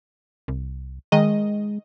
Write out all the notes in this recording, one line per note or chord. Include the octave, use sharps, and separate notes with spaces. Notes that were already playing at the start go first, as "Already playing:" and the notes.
C2
D#3 G#3 D#5